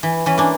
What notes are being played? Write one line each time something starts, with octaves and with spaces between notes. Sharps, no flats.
E3
E3 C#4
A#3 D4